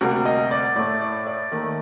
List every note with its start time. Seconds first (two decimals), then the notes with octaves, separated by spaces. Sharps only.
0.01 D2 C3 G3 A#3 F#4
0.25 D#5
0.51 D5
0.76 A2 A3 D5
1.01 D5
1.27 D5
1.52 D#2 D#3 A3